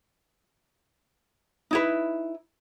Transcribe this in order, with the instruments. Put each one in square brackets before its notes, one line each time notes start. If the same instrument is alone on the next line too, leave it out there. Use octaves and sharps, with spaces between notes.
[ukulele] D#4 E4 B4